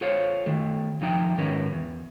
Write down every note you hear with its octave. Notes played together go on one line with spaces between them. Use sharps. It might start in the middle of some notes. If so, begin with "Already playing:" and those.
F4 A4 C5 C#5 F5
D#3 A3
F2 F3 D#4 G5
G#2 D#3 C#4 A#4 B4
E2